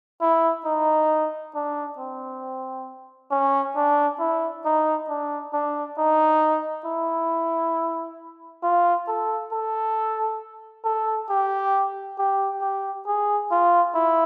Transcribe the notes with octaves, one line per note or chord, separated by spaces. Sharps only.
E4
D#4
D4
C4
C#4
D4
E4
D#4
D4
D4
D#4
E4
F4
A4
A4
A4
G4
G4
G4
G#4
F4
E4